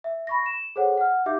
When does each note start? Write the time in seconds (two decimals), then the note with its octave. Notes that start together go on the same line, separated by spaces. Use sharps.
0.04 E5
0.27 B5 C#6 A#6
0.46 E7
0.76 G#4 A4 C5 C#5 F#5
0.97 F#5 F6
1.26 D#4 G4 E5 F5 D6 G6